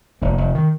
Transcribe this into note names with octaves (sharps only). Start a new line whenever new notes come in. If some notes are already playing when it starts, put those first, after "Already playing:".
F1 A#3
F1
D#3